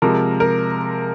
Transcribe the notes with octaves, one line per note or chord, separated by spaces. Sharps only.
C3 F3 G#3 A#4
A#4